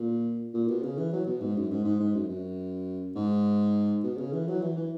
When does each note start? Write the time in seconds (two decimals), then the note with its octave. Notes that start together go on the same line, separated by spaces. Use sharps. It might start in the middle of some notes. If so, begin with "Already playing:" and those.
Already playing: A#2
0.54 A#2
0.68 B2
0.83 C#3
0.98 E3
1.13 F#3
1.26 B2
1.41 G#2
1.57 F#2
1.71 G#2
1.85 G#2
2.00 G#2
2.15 F#2
2.29 F#2
3.16 G#2
4.03 B2
4.18 C#3
4.33 E3
4.48 F#3
4.62 E3
4.77 E3